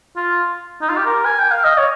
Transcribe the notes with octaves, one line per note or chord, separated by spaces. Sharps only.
F4
D#4
F4
G4
A#4
G#5
G5
F5
D#5
C#5